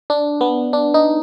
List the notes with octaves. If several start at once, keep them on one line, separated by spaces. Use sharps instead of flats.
D4
B3
D4
D#4